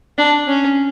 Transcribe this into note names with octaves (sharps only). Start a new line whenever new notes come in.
D4
C#4